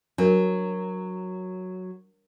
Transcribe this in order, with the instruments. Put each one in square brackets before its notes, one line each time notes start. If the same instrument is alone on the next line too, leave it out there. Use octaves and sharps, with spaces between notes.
[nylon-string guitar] F#3 [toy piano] D4 A#4